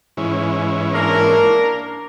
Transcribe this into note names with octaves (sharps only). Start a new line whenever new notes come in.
G#2 E3 C#4
A#3 D4 A#4